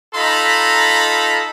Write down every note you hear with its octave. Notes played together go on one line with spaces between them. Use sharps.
D#4 F4 A4 A#5 B5